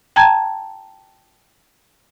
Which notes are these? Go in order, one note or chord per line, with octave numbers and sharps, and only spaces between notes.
G5 A5 A#5 G#6